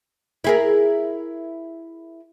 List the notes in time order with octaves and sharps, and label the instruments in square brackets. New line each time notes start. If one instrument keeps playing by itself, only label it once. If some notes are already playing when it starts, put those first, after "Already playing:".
[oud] E4 G#4 A#4